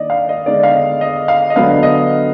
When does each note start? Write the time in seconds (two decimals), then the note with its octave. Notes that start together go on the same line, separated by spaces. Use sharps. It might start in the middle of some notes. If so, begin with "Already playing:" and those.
Already playing: D#3 A#3 D4 D5 D#5
0.10 F5
0.29 D#5
0.46 D3 G#3 B3 D#4 D5
0.63 F5
0.74 D#5
1.01 D#5
1.28 F5
1.50 D#5
1.55 D3 F#3 B3 D4 F5
1.83 D#5